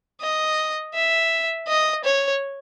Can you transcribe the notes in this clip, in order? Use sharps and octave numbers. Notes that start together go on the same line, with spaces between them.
D#5
E5
D#5
C#5